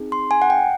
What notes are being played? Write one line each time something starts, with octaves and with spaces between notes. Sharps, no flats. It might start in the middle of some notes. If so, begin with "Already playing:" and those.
Already playing: C4 D#4 G#4
C6
G#5
F#5
G5